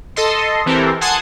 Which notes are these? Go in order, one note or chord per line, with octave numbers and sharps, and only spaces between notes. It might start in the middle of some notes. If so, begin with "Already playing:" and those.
A4 D#5 C6
E3 C4 G4 A4 A#4
F#5 G#5 A5 C6 D#6 G#6